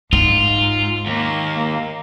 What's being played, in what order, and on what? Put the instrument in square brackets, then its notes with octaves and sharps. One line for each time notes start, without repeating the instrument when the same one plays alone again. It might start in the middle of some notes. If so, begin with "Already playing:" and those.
[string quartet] G#2 [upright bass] D#4 [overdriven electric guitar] F4
[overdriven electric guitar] D#2 [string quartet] A#3